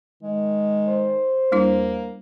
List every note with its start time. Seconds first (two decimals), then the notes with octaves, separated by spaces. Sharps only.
0.23 D#3 G#3
0.87 C5
1.52 D#2 G3 A#3 D4 E4